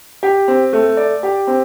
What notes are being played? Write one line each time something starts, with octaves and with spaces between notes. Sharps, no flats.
G4
C4
A3
D5
G4
C4